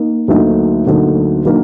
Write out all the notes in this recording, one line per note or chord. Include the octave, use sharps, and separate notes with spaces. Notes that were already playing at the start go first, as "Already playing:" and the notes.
Already playing: A#3 D#4
D2 D3 F#3 A#3 D#4
D2 D3 F#3 A#3 D#4
D3 F#3 A#3 D#4